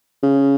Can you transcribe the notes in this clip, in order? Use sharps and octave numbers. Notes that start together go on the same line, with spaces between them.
C#3